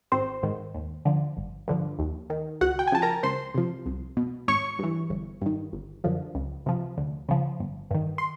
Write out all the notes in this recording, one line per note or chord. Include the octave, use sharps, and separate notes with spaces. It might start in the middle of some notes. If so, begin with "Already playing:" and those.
G#1 C4 C5
G#2 D#3
D#2
D3 F3
G1
G2 D3 F3
D#2
D#3
C#2 F#4 F#5
G5
G#5
C#3 F3 A5
A#4 A#5
C#2 C5 C6
C3 F3
C2
B2
G#1 C#5 C#6
G2 E3
G1
G2 D#3
G1
F#2 D3 F3
C#2
C3 F3
D2
C#3 F3
G1
G2 D#3
C6